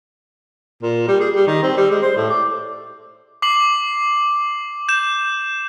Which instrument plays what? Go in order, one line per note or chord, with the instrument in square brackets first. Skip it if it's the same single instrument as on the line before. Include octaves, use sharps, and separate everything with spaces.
[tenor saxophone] A#2
G3
G#4
G3
D#3
C4
G3
G#3
C5
A2
D5
[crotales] D6 C7 F#7
G6 E7